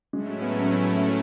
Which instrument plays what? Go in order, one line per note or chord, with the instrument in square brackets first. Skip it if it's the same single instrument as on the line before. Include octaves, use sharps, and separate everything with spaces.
[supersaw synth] A2 F#3 A3 C#4 E4 [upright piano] G#3
[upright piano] B3
C#4
B3
A3